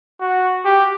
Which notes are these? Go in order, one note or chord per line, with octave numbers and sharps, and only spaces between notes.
F#4
G4